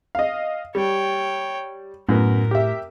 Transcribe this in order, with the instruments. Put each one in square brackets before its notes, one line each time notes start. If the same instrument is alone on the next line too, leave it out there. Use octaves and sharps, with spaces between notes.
[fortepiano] D#5 F5
[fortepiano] G3 [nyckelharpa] C#5 G5
[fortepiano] F#2 B3 [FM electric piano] A2 [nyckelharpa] A#4
[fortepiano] G4 E5